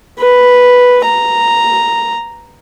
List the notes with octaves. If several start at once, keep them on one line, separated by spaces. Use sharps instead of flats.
B4
A#5